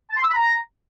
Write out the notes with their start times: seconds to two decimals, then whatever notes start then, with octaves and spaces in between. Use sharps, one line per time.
0.10 A5
0.16 C6
0.23 E6
0.29 B5
0.35 A#5